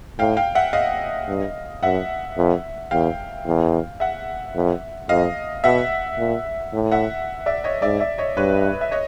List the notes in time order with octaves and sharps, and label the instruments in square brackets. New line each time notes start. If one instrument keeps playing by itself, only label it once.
[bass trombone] A2 [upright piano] F5 G5
[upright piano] F5 G5
E5 F#5
D#5 F5
[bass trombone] G2
[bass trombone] F#2 [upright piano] E5 F#5
[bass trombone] F2
[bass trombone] E2 [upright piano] F5 G5
[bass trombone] E2
[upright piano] E5 F#5
[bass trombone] F2
[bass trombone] F2 [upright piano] D#5 F5
[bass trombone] B2 [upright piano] E5 F#5
[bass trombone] A#2
A2
[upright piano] E5 F#5
D5 E5
C#5 D#5
[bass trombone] G#2 [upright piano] D5 E5
[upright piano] D5 E5
C#5 D#5
[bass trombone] G2 [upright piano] B4 C#5
[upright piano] E5
C#5 D#5